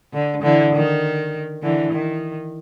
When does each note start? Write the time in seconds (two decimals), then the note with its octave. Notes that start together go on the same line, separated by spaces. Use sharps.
0.13 D3
0.42 D3 E3
0.74 D#3
1.62 D3 E3
1.92 D#3